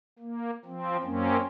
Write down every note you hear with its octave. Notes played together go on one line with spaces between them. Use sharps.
A#3
F3 C4
F#2 A#3 C4 C#4